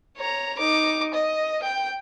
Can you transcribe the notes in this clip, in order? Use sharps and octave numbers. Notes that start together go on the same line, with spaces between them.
C#5 A#5
D#4 D6
D#5
G5